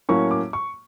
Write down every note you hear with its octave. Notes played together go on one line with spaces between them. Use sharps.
A2 F#3 A#3 C#4 C#6
D6
C#6